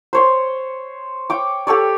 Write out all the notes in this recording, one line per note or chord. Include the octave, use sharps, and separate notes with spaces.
C5 C#5 C6
C#5 G5 D6
G4 A4 C#5 D5